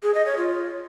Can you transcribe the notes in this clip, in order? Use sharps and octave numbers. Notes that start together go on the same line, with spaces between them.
G#4
D#5
C#5
F4